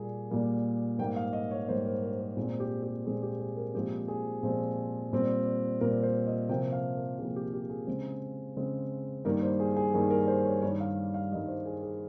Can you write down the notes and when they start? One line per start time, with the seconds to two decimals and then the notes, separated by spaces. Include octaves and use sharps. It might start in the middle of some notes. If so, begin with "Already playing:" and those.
Already playing: A#2 G3 A#3 G#4
0.30 A#2 G3 A#3
0.99 G#2 G3 A#3 G5
1.16 F5
1.33 D#5
1.51 C#5
1.68 G#2 G3 A#3 C5
1.85 A#4
2.02 A#4
2.20 A#4
2.37 A#2 G#3 C4 G#4
2.60 G4
2.83 G4
3.05 A#2 G#3 C4 G#4
3.23 G4
3.40 G#4
3.57 A#4
3.74 A#2 F3 G#3 C4 G4
4.08 G#4
4.43 A#2 F3 G#3 C4
5.13 A#2 G3 C4
5.81 A#2 G3 C4 A#4
6.03 C5
6.27 D#5
6.49 C3 F3 A#3 G5
6.72 F5
6.95 A#4
7.19 C3 F3 A#3 G#4
7.36 G4
7.54 G4
7.70 G#4
7.87 C#3 G#3 C4
8.57 C#3 G#3 C4
9.25 G2 D#3 G3 A#3 A#4
9.43 C5
9.60 G#4
9.77 G#4
9.94 G2 D#3 G3 A#3 G#4
10.10 A#4
10.28 C5
10.45 C#5
10.62 G2 D#3 G3 C#5
10.80 F5
11.14 F5
11.31 G2 D#3 G3 D#5
11.48 C5
11.66 G#4
11.82 G#4